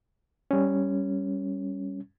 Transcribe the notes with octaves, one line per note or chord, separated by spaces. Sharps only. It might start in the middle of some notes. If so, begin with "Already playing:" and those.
G3 C#4